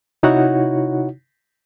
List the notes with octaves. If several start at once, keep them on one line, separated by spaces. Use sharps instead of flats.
C3 D#4 E4 F#4 C#5 F#5